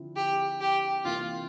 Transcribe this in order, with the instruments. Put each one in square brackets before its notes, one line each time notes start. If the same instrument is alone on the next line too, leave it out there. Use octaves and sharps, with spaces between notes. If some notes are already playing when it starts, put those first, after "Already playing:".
Already playing: [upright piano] D3 F3 C4 E4
[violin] G4
G4
[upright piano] C3 E3 A#3 [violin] F4